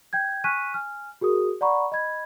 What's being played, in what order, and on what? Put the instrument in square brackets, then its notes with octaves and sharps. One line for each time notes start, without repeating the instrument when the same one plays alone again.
[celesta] G5 G6 G#6
G#5 C#6 F6 F#6 B6 D#7
G#5 F6
F#4 G#4 A#4 D#6
D5 F#5 A#5 B5 C#6
D#5 B5 G#6